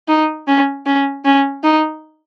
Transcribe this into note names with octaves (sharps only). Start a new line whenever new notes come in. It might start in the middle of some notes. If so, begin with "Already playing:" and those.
D#4
C#4
C#4
C#4
D#4